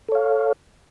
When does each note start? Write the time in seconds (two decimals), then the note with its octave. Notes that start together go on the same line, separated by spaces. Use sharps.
0.09 A4
0.12 C#5
0.15 F5